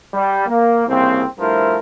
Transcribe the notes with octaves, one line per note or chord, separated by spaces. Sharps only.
G3
A#3
C2 C#3 A#3 C4
G2 F3 A3 E4 A#4 C5